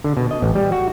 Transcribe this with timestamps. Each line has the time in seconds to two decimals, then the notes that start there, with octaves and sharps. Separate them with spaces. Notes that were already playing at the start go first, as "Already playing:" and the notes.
0.04 D3
0.17 B2
0.31 D#5
0.42 A1
0.55 G3
0.72 F#4